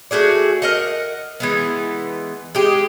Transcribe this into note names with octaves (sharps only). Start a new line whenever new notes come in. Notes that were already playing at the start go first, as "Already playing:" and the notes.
A3 F#4 G#4 D5
A#4 D#5 F#5
E3 G#3 B3
G#3 G4